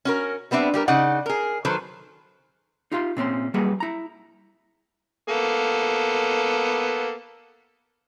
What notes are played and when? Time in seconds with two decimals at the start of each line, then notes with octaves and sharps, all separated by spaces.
0.05 C#4 F#4 A#4
0.51 G3 B3 C4 D4 E5
0.74 G3 G4 A#4
0.88 C#3 D#4 D5 F#5
1.26 G#4 A#4
1.65 D#3 F#3 A4 B4 C5
2.92 D#4 F4 G4 F5 C6
3.17 A#2 C4 C#4 C6
3.54 F#2 G3 A#3 G#4 B4 F#5
3.80 E4 A#5
5.29 A#3 B3 A4